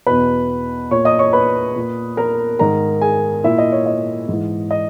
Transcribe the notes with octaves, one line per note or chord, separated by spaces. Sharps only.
E2 B2 B4 B5
A#2 C#5 C#6
D#5 D#6
C#5 C#6
B4 B5
A#2
A#4 A#5
G#2 D#3 A#4 A#5
G#4 G#5
A#2 E4 E5
D#5
C#5
D#5
G#2 E3
D#5